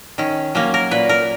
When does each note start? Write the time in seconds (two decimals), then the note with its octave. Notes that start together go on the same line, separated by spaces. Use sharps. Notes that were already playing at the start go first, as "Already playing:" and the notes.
0.18 D#3 C#4
0.55 F#3 A#3 C#4
0.74 A#4
0.91 A#2 B4
1.09 A#4